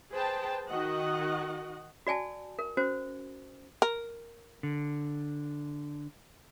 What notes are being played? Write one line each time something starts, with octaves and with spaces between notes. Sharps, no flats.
G#4 B4 C5 G5 A5
D#3 F#4 D#5 F#5
F#4 D5 G#5 A5
A#4
C#4 F#4 C5
A#4
D3